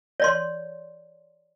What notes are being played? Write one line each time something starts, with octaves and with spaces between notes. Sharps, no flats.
C#5 D5 C6